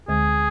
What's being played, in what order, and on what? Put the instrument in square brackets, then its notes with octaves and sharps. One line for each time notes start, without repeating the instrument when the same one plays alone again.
[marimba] D2 D3 G#3 [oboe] G#4